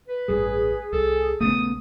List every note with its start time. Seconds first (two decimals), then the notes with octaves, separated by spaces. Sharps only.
0.08 B4
0.28 A1 G2 G3 G#4
0.93 C2 A4
1.41 A#1 C#3 A3 B3 C#4 D#6